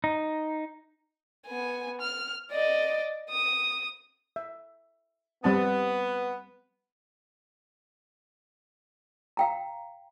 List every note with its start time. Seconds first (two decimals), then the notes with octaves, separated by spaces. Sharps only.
0.04 D#4
1.47 B3 G#5
2.01 F6
2.51 D5 D#5
3.30 D#6
4.36 E5
5.44 G3 B3 C4 A5
9.37 F5 G5 A#5